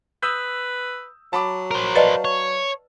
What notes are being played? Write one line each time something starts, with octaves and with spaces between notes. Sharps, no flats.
B4 D#6 E6 G6
F#3 A5 B5 D6
A#4 C5
B4 D5 D#5 F5 A5
C#5